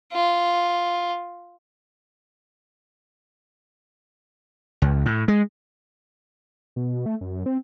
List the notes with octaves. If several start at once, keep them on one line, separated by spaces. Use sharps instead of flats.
F4
C#2
A2
G#3
B2
A3
F#2
C4